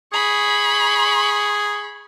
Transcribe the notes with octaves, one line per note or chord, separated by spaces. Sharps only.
G#4 B5 C#6